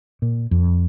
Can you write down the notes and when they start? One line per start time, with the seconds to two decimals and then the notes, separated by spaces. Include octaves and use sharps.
0.22 A#2
0.51 F2